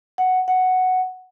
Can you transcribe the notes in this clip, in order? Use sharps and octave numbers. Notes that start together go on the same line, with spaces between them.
F#5
F#5